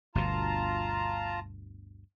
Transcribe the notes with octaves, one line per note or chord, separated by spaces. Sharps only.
G1 D2 B2 F4 A5 A#5